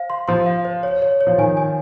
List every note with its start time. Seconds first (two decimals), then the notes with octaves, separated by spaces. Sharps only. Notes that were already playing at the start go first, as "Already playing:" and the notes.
Already playing: C5 F5
0.10 C6
0.28 F3 C6
0.46 F5
0.65 C5
0.83 C#5
1.02 C#5
1.21 C#5
1.27 F3
1.38 D#3 G#5
1.57 G#5